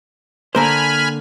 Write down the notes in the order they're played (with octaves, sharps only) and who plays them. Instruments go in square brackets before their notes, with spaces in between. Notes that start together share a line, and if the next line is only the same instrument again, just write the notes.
[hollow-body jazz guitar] D3 A#3 C5 [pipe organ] G#5 B5 F6